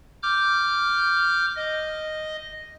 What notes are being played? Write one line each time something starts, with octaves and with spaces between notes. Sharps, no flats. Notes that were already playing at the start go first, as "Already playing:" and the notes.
D6 F6 G6
D#5